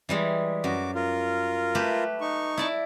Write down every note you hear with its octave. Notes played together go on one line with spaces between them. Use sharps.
E3 G3 G#3
F#2 F#4 D6
F4 A#4
A3 G4 B4
D#4 C#6
E4 D5 A5